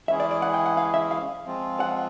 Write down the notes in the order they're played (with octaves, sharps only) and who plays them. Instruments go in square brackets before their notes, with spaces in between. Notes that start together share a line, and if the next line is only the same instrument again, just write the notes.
[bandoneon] E3 G#3 C#4 E4 G#4 [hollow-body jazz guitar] E5
[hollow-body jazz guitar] D5
D5
F#5
G5
F#5
F5
E5
F5
[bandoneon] F3 G#3 C4 F4
[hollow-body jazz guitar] F#5